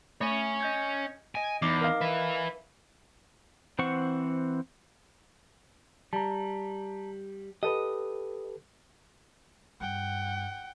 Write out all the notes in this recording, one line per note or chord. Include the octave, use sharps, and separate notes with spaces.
A3 C#5 G#5
D#5 G6 G#6
D#5 G#5 D7
E2 D#4 D6 C7
A#4 D#5 F5
B4 E5
E3 C4 C5 F#5 C#6
G3 A5 A#5
G4 A4 B4 D#5
G2 F#5 G5